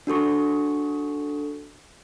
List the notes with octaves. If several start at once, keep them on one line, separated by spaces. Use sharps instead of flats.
D4 F#4 A4 C#6